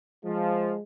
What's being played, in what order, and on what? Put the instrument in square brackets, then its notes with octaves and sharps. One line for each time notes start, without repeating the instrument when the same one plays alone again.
[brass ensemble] F3 [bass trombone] G#3